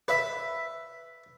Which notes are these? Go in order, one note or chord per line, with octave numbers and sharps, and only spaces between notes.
B4 E5